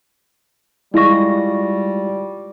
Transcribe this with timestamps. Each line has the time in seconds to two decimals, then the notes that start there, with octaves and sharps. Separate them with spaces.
0.94 G3 G#3 E4 F4 C#6 A#6